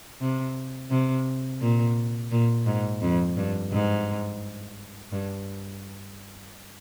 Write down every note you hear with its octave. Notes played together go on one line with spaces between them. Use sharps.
C3
C3
A#2
A#2
G#2
F2
G2
G#2
G2